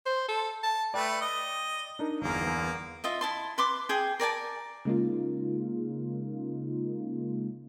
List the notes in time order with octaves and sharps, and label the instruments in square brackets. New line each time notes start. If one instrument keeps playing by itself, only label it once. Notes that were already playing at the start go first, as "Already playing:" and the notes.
[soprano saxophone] C5
A4
A5
[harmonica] A3 B4 [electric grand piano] D5 G5
[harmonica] D#5
[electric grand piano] D4 D#4 A#4
[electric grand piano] G1 E2 [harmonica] A#3
[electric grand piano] E2 B3
[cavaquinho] F4 D#5 E5
E4 A5 C6
B4 C6 D6
G#4 G5
A#4 D5 G#5 A5
[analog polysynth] C#3 G#3 A#3 D#4 F4